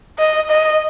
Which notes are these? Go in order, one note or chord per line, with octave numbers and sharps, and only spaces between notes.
D#5
D#5